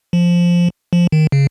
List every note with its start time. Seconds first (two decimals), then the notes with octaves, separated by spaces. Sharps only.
0.13 F3
0.93 F3
1.12 D#3
1.32 C#3